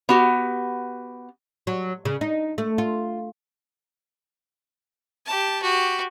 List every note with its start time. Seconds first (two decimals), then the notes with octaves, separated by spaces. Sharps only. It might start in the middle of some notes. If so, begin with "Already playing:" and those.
0.09 B3 F#4 G4
1.67 F#3
2.05 C#3
2.21 D#4
2.58 A3
2.78 F4
5.26 G4 A5
5.62 F#4 G4